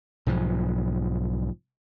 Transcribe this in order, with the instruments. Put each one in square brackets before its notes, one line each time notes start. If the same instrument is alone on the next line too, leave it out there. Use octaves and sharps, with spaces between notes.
[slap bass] B1 G#2 F3